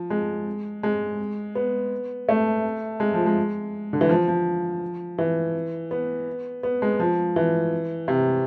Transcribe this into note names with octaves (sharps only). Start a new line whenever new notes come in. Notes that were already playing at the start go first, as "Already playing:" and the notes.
Already playing: F3
G#3
G#3
B3
A3
G#3
F3
G#3
D3
E3
F3
F3
E3
B3
B3
G#3
F3
E3
C3